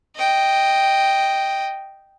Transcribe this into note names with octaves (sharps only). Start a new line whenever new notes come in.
D#5 G5